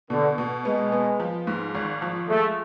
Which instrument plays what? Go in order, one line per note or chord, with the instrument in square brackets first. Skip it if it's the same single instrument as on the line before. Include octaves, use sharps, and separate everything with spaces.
[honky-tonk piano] B2 [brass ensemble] D3
[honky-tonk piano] B2
[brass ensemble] G#3 [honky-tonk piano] B3
[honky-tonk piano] B3
F3
G#2
G#1
F3
[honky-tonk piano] G#3 [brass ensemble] A3